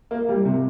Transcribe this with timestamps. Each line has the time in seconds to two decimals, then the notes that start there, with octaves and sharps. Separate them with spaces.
0.11 A#3
0.29 G3
0.45 C3